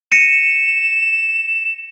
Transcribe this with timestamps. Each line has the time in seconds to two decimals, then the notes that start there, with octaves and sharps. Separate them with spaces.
0.12 A#6 C#7 D#7 E7